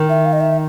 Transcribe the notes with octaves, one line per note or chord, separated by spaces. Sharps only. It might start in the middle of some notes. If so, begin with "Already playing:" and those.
Already playing: D#3
E5
F5
D#5
E5